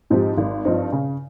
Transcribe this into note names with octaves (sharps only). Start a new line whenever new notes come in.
G#2 F3 C4 G4
G#1
G2 F3 C4 D#4
C#3